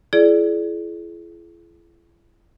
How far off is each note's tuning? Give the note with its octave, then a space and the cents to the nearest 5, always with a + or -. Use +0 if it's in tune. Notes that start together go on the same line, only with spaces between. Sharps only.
E4 +45 G#4 +35 D5 +0